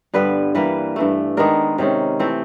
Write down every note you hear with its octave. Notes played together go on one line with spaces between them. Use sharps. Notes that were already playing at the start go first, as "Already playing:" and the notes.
G2 D3 G3 B3 B4
E3 G3 A#3 B4
G2 E3 A3
D#3 G#3 B3 D4 A#4
C3 D#3 G#3 C#4
E3 A3 C4